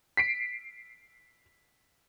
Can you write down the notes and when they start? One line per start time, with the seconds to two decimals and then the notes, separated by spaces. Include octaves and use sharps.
0.17 B6 C7 D7